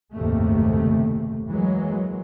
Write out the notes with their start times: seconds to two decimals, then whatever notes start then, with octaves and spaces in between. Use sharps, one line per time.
0.15 F#1 D#2 G#2 C3 A3
1.49 E3 F#3 G#3 A#3